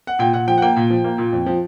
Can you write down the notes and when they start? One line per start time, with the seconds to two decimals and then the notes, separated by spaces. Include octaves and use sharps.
0.07 F#5
0.19 A#2 G5
0.33 A#2 F#5
0.48 F3 G5
0.58 F#5
0.62 A#3 G5
0.76 A#2
0.90 F3
1.04 A#3
1.18 A#2
1.33 F2
1.46 F3